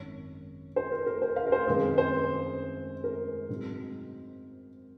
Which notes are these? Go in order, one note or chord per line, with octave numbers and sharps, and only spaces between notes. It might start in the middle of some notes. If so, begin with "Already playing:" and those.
Already playing: G#1 F#2 D#3 C#5
C5
A#4
A#4
C5
F5
A#4
C5
F#2 D#3 G#3 C4 G#4
C5
A#4
G#2 F#3 C4 D#4